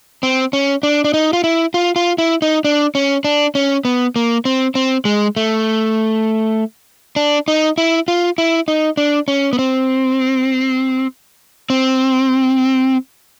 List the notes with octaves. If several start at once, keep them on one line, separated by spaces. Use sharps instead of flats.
C4
C#4
D4
D4
D#4
F4
E4
F4
F4
E4
D#4
D4
C#4
D4
C#4
B3
A#3
C4
C4
G#3
A3
D4
D#4
E4
F4
E4
D#4
D4
C#4
B3
C4
C4